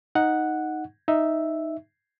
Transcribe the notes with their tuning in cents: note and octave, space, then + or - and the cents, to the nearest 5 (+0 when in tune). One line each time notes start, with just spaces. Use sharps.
D#4 +0 F#5 -5
D#4 +0 E5 +0